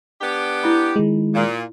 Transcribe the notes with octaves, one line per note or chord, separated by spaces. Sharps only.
B3 D4 G4
E4 B5
D#3 G#3
A#2